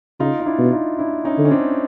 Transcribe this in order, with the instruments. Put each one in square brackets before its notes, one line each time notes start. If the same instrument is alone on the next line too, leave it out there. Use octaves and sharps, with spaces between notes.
[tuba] C#3 [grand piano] D#4 F4
[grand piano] D#4
D4 E4
[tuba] B2
[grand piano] D#4 F4
D4 E4
C#4 D#4
[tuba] D3
[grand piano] C#4
C4 D4